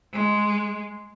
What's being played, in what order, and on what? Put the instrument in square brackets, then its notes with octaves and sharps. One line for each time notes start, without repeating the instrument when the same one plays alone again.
[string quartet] G#3